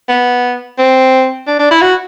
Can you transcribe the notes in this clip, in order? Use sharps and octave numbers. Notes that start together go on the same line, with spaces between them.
B3
C4
D4
D4
E4
F#4